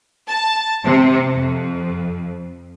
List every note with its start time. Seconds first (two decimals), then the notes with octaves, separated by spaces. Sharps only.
0.27 A5
0.84 C3
1.33 F2